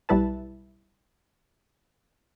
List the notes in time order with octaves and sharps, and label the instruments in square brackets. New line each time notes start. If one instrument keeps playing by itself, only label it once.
[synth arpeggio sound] B1 G3 E4 B4 A5